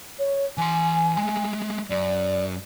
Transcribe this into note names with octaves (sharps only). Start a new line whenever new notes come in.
C#5
E3 G#5 C6
G#3 A3
F#2 D5